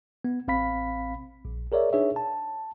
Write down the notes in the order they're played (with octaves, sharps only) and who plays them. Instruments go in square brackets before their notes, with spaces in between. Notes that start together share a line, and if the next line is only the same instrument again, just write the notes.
[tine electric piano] B3
A1 C4 F5 B5 B6
A#1
G#4 A#4 C#5 D5 E5
D4 D#4 G#4 B4 C#5 E5
A5